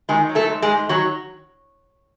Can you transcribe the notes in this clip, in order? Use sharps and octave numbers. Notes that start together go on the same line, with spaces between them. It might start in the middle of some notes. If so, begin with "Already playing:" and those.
D#3 G#3 G#4
F#3
A3 A4
G#2
G#3 G#4
G#2
D#3 F#3 F#4